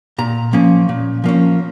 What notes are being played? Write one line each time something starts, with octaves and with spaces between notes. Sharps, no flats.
A#2 A#5
F3 A#3 C#4
A#2
F3 A#3 C#4